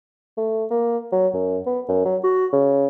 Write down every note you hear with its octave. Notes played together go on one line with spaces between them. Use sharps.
A3
A#3
F#3
F#2
B3
F#2
F#3
F#4
C#3